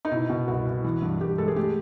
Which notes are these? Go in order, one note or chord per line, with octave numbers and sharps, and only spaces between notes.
D#4
B2 E4
B2
C2 F#4
C2
E3
G2
G2 G4
G#3 A4
G#4
A3 G4